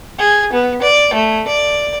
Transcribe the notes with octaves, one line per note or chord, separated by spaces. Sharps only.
G#4
B3
D5
A3
D5